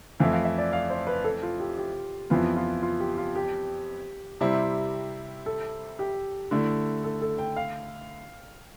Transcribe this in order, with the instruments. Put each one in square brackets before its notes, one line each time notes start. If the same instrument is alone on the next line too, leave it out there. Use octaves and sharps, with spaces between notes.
[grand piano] F2 E3 A3 E4 [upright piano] F5
[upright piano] F5
E5
D5
F5
C5
B4
A4
F4
G4
G4
[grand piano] F2 E3 B3 [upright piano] F4
[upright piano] F4
F4
G4
F4
G4
[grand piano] C3 G3 C4 E4
[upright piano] A4
G4
[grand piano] D3 A3 E4
[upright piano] A4
A4
G5
F5